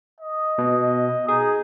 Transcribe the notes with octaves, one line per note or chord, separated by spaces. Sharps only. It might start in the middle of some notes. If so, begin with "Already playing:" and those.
D#5
B2
D#4 G#4